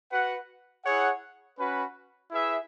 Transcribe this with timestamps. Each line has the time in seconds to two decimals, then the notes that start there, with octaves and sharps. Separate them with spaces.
0.11 F#4 B4 F#5
0.84 E4 G#4 C#5 F#5
1.58 C#4 F#4 B4
2.31 E4 G#4 B4 E5